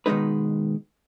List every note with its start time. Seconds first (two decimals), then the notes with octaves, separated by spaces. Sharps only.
0.06 B2 D#3 E3 G#3 D#4 B4